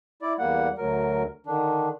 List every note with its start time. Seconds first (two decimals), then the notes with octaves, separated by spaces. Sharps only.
0.22 E4 D5
0.39 E2 G3 A#3 F#5
0.78 D2 F#3 A#4
1.46 D3 D#3 D4